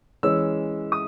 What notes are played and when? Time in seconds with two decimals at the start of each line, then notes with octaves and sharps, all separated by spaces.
0.23 E3 G#3 C#4 E6
0.92 D#6